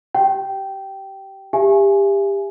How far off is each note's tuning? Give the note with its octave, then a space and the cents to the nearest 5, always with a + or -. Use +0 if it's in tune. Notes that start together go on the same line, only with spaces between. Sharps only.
G4 -20 G5 -10
G4 +25 E5 +35 G#5 +10